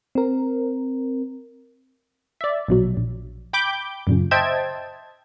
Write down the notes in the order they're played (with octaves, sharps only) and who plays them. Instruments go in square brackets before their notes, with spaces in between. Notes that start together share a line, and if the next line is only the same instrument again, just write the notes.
[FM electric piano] C4 A#4
[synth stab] D5 E5
A#1 B2 F#3
A#1
G5 B5 D6 G6
F#2 A#2 C#3
C5 D#5 E5 G5 A5 G#6